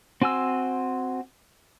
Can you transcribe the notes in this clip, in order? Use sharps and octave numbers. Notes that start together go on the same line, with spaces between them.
C4 F#4 G#5 C6 E6